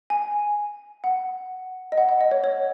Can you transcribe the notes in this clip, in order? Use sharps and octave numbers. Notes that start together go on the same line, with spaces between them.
G#5
F#5
D#5
F#5
F#5
D#5
C#5
C#5